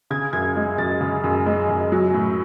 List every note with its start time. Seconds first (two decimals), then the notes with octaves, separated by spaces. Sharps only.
0.10 C#3 G#6
0.33 F#2 G#6
0.56 G#3
0.78 F#2 A6
1.01 C#3
1.24 F#2
1.46 G#3
1.69 F#2
1.92 F#3
2.14 A2